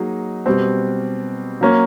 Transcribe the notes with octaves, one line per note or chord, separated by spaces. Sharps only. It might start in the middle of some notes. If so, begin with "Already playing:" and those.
Already playing: F#3 A#3 D#4 G#4
B2 G3 C4
F#3 A#3 C#4